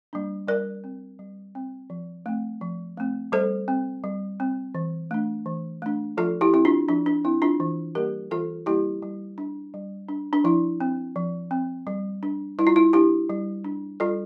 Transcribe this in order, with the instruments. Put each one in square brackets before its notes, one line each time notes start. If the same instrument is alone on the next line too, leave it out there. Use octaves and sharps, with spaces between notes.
[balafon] G3 A#3 D4
G3 A#4 D5
C4
G3
C4
F3
A3 C4
F3
A3 C4
G3 A4 C5
C4
G3
C4
E3
A3 D4
E3
A3 D4
F3 F4 A4
E4 G4
C4 E4
D4 F4
F3 D4
D4
C4 E4
D4 F4
E3
G3 A#3 G4 A#4
E3 F4 A4
G3 A#3 E4 G4
G3
D4
G3
D4
D4
F3 E4
C4
F3
C4
G3
D4
G3 E4
F4
E4
D4 E4 G4
G3
D4
G3 F4 A4